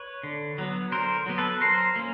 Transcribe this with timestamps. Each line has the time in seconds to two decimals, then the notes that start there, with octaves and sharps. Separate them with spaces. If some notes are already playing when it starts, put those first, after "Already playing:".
Already playing: B4 C#5
0.23 D3
0.58 F#3 B3
0.92 D3 A#4 C5
1.26 F#3 B3
1.38 A4 B4
1.60 F#3 A#4 C5
1.96 A#3 C#4